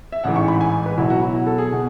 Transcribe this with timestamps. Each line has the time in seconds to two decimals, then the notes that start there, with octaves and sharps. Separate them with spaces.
0.12 E5
0.24 A1 G#2 E3 F#5
0.36 C#6
0.48 B5
0.61 G#5
0.86 B4
0.98 B1 B2 F#3 E4
1.10 F#4
1.22 E4
1.35 F#4
1.47 A4
1.58 G#4
1.73 B2